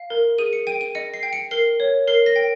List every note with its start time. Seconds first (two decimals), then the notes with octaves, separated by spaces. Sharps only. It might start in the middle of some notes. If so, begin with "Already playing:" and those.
Already playing: F5
0.10 A#4
0.38 G#4 D#7
0.53 C#7
0.67 G5 D#7
0.81 D#7
0.95 D#5 C#7
1.14 C7
1.23 G5
1.33 C#7
1.51 A#4 C7
1.80 C#5
2.08 A#4 C7
2.26 A#6
2.36 G5